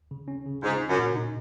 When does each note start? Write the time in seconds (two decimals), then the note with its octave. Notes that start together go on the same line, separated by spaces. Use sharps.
0.11 C#3
0.28 C#4
0.46 C#3
0.63 G#2 F4
0.81 C#4
0.89 F#2
0.99 A#2
1.16 D#4